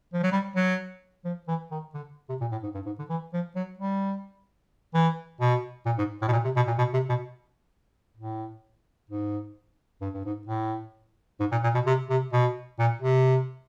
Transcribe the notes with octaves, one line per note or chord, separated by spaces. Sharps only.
F3
F#3
G3
F#3
F3
E3
D#3
D3
C3
A#2
A2
G#2
G2
G#2
D3
E3
F3
F#3
G3
E3
B2
A#2
G#2
A2
B2
A#2
C3
B2
A#2
B2
C3
B2
A2
G#2
G2
G2
G#2
A2
G#2
A#2
A#2
B2
C3
C3
B2
A#2
C3